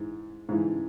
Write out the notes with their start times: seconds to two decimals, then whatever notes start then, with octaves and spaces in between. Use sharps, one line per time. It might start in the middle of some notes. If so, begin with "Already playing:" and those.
Already playing: G#2 E3
0.49 G#2 E3